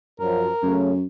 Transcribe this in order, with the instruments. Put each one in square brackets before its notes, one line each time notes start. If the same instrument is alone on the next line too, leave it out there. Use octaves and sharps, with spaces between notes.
[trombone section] F#2 F3 [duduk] A#4
[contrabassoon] F#2 [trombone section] C#3 A3 C#4